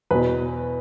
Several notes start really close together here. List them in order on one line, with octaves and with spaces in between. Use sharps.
E2 B4 B2